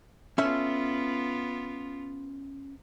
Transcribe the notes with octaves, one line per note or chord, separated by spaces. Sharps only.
B3 C#4 F4 A4 E5